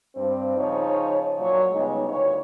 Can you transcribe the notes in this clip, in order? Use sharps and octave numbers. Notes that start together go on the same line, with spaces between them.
G2 C4
C#3 F3 D#4 C#5
A#2 F#3 C#5
C#3 G3 G#3 B3 D#4
D2 A#2 B4 C#5